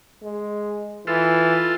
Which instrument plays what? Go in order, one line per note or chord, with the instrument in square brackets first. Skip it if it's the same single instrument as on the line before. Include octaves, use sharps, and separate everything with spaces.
[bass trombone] G#3
[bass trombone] E3 [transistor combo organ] F4 A4